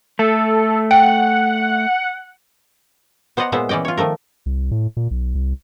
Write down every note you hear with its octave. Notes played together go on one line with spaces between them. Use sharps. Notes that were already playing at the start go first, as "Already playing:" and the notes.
A3 A4
F#5 G5
B3 C5 D5 D#5 F#5 A#5
A#2 G#3 B3 C5 E5
E3 C#4 D5 D#5 G5
F4 C#5
D#3 F3 A3 A#4
C2
A2
A#2
B1
C2